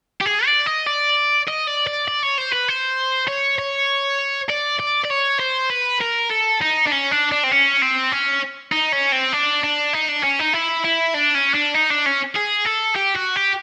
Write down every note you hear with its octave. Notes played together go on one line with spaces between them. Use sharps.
G4
G#4
D5
D#5
D5
D#5
D5
D5
D5
C#5
C5
B4
C5
C#5
C#5
D5
D5
D5
C#5
C5
B4
A#4
A4
D#4
D4
C#4
D4
D4
C4
C#4
C4
C#4
D#4
C#4
C4
D4
D4
D#4
D4
C#4
D#4
E4
E4
D4
C#4
D4
D#4
D4
C#4
G#4
A4
G4
F#4
G4